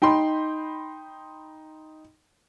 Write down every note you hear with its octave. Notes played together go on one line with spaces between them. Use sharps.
D#4 G5 B5 C6